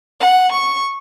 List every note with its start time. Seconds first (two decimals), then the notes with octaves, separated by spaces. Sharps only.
0.20 F#5
0.52 C#6